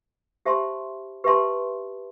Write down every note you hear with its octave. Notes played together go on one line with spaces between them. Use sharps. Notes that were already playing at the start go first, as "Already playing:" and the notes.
G4 C5 E5 A5 C6
G4 B4 E5 A5 C6